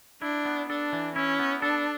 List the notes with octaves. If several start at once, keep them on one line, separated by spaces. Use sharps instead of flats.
D4 E4
B3
D4 A4
E3
C#4 E4
B3
D4 A4